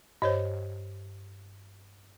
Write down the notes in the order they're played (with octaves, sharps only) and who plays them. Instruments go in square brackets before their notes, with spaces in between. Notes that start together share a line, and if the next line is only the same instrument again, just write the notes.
[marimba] G2 [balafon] C5 C#5 D#5